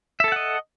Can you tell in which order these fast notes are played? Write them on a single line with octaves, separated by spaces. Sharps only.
E5 A4 A5 F#5 D#5